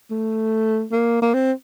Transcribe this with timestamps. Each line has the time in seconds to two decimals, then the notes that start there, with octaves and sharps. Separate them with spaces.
0.11 A3
0.92 A#3
1.22 A#3
1.34 C4